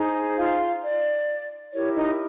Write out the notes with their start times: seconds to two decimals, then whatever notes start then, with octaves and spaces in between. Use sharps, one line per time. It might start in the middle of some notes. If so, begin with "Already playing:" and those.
Already playing: D#4 G#4 C5
0.37 F4 F5
0.83 D5
1.73 E4 G4 A#4 C#5
1.95 D#4 D#5